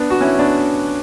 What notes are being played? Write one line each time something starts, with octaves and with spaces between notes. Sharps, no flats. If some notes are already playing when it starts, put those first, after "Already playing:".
Already playing: B3 D4
F#4
C#4 E4
B3 D4